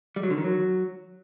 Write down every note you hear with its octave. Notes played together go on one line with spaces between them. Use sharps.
G3
F#3
D3
D#3
F#3